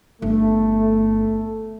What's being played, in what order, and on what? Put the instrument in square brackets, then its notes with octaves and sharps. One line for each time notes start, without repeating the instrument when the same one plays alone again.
[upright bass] G1 [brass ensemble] A3